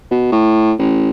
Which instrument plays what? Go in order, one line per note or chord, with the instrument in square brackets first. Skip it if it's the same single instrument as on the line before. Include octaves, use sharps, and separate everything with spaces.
[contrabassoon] B2
A2
A1